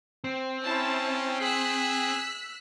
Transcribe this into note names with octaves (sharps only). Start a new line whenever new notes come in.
C4
C#4 E4 A5
G#4 E6 F#6 B6